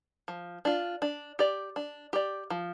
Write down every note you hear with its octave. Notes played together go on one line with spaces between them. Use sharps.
F3
D4 F4
D4
G4 D5
D4
G4 D5
F3